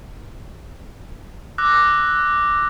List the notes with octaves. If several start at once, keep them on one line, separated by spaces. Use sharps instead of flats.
D6 E6 F#6 A#6